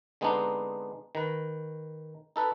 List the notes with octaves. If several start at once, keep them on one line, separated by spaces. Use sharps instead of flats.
D3 G#3 B3 C4 D4 D#4
D#3 B4
D#4 A4 B4